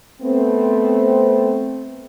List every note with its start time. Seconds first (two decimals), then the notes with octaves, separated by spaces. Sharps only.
0.22 A3 B3 C4